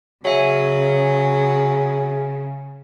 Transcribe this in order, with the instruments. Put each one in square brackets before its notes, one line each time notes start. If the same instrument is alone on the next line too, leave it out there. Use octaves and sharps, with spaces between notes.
[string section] C#3 [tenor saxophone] F#3 [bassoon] G#4 [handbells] C#5 E5 G#5